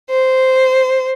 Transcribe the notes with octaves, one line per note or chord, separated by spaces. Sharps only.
C5